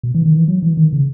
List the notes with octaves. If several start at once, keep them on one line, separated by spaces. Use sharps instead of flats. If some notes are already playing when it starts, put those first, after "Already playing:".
B2
E3
D#3
E3
F#3
E3
D#3
C#3